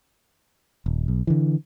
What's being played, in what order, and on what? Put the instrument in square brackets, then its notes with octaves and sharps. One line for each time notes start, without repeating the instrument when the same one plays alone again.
[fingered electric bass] D#1
B1
D3 E3